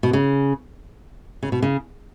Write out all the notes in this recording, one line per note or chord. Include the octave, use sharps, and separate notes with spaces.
B2
C#3
C#3
B2
C#3